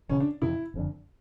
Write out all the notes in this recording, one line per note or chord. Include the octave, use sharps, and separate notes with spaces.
E1 E2 C#3 C#4
D4
F2 C3 E3 E4
F#1 F2 D3